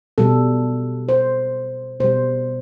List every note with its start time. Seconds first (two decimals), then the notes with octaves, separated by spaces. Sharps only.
0.18 B2 G3 A4
1.09 C5
2.00 B2 G3 C5